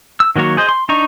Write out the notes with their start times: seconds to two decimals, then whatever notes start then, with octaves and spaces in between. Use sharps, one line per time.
0.20 E6
0.36 D#3 F#3 A#3 F#4 C#5
0.57 G#4 C5 D#5
0.69 C6
0.89 D4 D#4 A#5 C#6